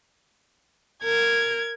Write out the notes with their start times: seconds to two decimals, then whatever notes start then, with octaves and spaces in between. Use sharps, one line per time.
1.04 A#4 G#6